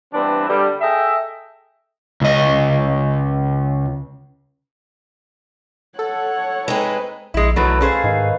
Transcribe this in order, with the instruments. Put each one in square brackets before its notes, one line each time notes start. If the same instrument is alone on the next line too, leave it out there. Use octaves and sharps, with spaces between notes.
[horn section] G2 E3 B3 C4 D4
D3 G3
G#4 A4 D#5 E5 G5
[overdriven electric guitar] C#2 D#5
[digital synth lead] A4 [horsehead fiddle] C#5 [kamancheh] F#5
[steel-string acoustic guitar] G#3 C4 [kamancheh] D#4 B4
[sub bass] A#1 [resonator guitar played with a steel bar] G#3 E4
[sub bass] B1 [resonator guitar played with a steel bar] E3 F#3 A3 [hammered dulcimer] B4 A#5 B5
[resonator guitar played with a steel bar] C#4 G#4 C5 [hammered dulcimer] A4 F5
[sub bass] G#2 [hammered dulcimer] D#3